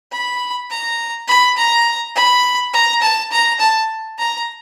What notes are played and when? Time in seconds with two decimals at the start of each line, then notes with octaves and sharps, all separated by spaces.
0.12 B5
0.71 A#5
1.28 B5
1.57 A#5
2.16 B5
2.73 A#5
3.02 A5
3.32 A#5
3.60 A5
4.19 A#5